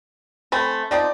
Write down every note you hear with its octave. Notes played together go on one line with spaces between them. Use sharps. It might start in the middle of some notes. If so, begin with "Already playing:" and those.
A3 C4 G#5 B5
F3 C4 D#4 D5